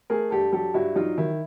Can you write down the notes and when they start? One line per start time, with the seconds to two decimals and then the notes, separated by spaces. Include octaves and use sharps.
0.10 A3 G#4 A#4
0.31 G2 G4 A4
0.52 F#3 G4 A4
0.74 G2 E4 F#4
0.95 F#3 D#4 F4
1.18 D#3 E4